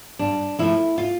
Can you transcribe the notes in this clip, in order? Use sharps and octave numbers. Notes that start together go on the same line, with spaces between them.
G2 D4
F3 A3 E4
F4